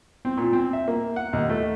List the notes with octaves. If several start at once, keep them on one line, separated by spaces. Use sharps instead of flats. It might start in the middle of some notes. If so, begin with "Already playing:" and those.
C4
A#2
C4
E5
A#3
F#5
D#2
A3